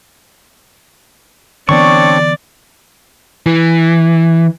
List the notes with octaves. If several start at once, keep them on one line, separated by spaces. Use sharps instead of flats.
D3 E3 B3 C4 D4 C#5 D5 C#6
E3